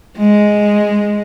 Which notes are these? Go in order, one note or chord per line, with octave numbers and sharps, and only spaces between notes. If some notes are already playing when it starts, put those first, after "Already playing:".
G#3